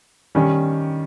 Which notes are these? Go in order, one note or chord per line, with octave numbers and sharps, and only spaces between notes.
D#3 G3 C#4